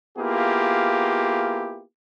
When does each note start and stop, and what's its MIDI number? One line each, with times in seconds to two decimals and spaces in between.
0.18 1.83 58
0.18 1.83 59
0.18 1.83 64
0.18 1.83 65
0.18 1.83 67
0.18 1.83 68